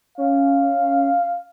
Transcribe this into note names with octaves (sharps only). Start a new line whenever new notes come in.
C#4 F5